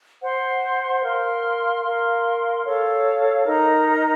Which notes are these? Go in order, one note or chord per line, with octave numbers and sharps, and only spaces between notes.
C5 F#5 C6
A#4 F5 C6
A#4 F5 C6
A4 C#5 F5
D#4 A#4 D#5 A#5